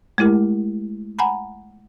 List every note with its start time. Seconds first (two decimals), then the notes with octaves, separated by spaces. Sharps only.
0.18 G#3 A3 E4 G4 A#4
1.19 F#5 G#5 A#5 B5